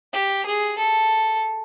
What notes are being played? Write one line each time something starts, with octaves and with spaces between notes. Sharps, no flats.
G4
G#4
A4